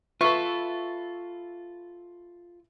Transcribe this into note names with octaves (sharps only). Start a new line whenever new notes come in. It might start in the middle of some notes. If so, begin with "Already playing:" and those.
F4 A4 B4 E5 C#6